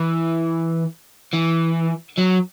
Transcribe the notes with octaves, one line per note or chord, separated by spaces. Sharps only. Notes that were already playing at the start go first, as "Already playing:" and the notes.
Already playing: E3
E3
F#3